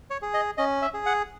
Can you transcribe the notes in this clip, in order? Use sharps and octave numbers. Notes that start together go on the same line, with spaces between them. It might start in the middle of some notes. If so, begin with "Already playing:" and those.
C#5
G#4
D#5
C#4 D#5
E5
G#4
F#5